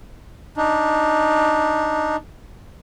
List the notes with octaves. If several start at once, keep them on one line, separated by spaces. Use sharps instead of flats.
D4 D#4